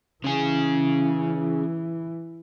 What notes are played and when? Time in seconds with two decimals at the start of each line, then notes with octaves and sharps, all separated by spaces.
0.24 C#3 E3 G#4